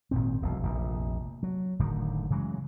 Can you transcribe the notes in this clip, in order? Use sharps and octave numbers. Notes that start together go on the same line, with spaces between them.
G#1 A#2 C4
E1 B1
F1 A#1
F#3
F#1 A2 D3 D#3
C#3 E3 F#3 G#3